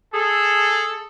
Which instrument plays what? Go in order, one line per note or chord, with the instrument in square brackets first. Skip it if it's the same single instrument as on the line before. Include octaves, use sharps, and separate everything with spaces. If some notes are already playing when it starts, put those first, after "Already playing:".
[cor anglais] G#4 [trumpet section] A4